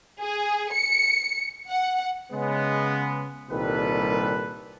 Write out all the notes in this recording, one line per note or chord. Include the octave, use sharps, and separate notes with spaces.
G#4
C#7
F#5
C#3 G#3 B3
C2 A#2 D#3 G3 A4 B4